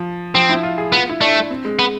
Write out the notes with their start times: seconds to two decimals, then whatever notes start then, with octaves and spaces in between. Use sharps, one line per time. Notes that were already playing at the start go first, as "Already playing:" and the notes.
Already playing: F3
0.34 F3 C4
0.49 E4
0.63 F4
0.78 G#4
0.92 B3 F4
1.09 E4
1.21 A3 D4
1.51 C4
1.65 G#3
1.79 B3